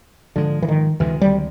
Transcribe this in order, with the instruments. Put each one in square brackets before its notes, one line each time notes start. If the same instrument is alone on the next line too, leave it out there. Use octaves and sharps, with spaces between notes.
[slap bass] G#2 F3 G#3 [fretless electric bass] D3
[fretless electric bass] E3
D#3
[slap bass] D2 C3 D#3 G#3 [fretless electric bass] E3
[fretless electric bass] G3